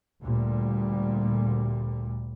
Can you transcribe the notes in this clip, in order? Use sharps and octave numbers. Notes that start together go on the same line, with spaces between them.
D2 A#2 G3